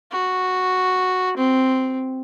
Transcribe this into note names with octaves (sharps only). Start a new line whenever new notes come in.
F#4
C4